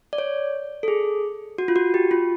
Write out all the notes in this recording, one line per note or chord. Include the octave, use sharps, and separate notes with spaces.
D5
C#5
A4
G#4
F#4
F4
F#4
G4
F4